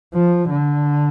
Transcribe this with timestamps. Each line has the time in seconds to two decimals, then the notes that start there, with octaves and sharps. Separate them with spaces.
0.14 F3
0.50 D3